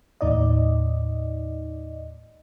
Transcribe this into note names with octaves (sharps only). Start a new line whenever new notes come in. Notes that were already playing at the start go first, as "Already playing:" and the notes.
D#2 A2 D#4 D5 D#5